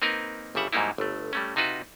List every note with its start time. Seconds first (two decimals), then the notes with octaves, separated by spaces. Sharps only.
0.02 A#3 C4 D#4 A#4 B4
0.55 G1 C#3 G3 E5 F#5
0.73 G#2 F#3 G3 A#3 D#4 E4
0.98 G1 A3
1.33 G3 A3 C#4
1.56 C3 D#4 F4 F#4 B4